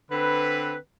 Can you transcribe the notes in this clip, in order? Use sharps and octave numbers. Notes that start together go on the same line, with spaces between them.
D3 C4 B4